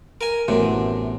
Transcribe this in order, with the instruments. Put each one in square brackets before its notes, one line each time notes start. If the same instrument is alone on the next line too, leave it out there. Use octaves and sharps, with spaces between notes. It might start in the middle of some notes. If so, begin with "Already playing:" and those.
[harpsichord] A#4 G#5
[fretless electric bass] A1 [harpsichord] F#2 C3 [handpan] E3 A3 B3